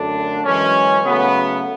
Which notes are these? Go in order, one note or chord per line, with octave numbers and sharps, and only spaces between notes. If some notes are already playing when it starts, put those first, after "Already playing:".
Already playing: F#2 D3 A3 D4
F#2 E3 G#3 C#4
C#3 F#3 A3 B3